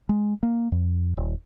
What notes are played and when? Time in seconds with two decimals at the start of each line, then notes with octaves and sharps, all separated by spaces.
0.09 G#3
0.43 A#3
0.72 F2
1.17 D#1